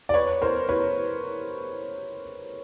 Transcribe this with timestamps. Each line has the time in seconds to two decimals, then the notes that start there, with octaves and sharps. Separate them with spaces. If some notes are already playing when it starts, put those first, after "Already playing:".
0.09 D5
0.14 B4 C#5
0.42 A#4 C5
0.69 B4 C#5